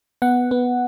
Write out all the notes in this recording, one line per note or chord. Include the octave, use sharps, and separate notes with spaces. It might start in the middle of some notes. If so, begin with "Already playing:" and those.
B3 F#5
B3